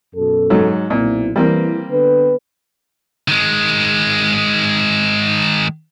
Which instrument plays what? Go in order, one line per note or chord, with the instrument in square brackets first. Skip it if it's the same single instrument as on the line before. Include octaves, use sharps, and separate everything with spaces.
[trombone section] F#2 B2 A4
[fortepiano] G#2 F#3
[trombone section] B1 C4 E4 [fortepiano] A#2
[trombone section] E3 [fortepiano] G3 A#3 C4
[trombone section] D3 B3 B4
[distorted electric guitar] D#3 G#3